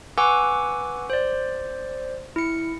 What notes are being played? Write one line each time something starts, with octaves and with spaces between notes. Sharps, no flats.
B4 F#5 G#5 C#6 D6 E6
C5 D5
E4 C#7